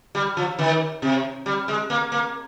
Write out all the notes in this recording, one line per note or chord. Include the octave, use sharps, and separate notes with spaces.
G3
F3
D#3
C3
G3
G#3
A#3
A#3